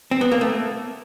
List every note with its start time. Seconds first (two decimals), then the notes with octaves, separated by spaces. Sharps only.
0.11 C4
0.21 B3
0.32 A#3
0.41 A3